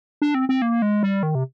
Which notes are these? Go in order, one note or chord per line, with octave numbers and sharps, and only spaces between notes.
D4
C4
C4
A#3
G#3
G3
D#3
C3